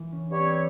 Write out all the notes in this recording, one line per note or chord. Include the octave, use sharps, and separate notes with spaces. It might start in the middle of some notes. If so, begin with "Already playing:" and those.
Already playing: E3
C#4
G2 G3 C4 C#4 G4 C#5